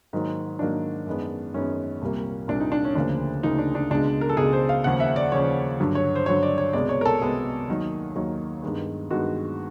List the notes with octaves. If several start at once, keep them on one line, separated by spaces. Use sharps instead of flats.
G#2 D#3 F#3 A#3
G#2 D#3 F#3 A#3 D4
F#2 D#3 G#3 B3
F#2 D#3 G#3 B3 C#4
C2 A#2 G3 A#3
C2 A#2 G3 A#3 D4
D#4
D4
C#4
D2 C#3 F3 A#3 D4
D2 C#3 F3 A#3 D#4
D4
D4
C#2 B2 G#3 D4
A#4
A4
C#2 B2 G#3 G#4
C5
F5
D#2 C#3 F3 F#5
E5
D5
D#2 C#3 F3 C#5
G2 D3 F#3
C#5
C5
G2 D3 F#3 C#5
D5
C#5
C2 B2 G#3 B3 D5
C#5
A#4
A4
C2 B2 G#3 B3 G#4
D#2 D#3 F#3
D#2 D#3 F#3
G2 D#3 G#3 B3
G2 D#3 G#3 B3 F#4